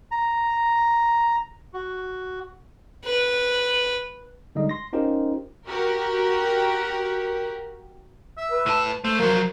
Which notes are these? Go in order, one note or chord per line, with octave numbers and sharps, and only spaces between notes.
A#5
F#4
B4
D3 G3 G#3 D#4 D#5
C6 A#6
C#4 D#4 F4 G4 A#4 C5
F#4 G4 A#4
E5
B4
A2 A5
A3 C5
F3 F#3 A#4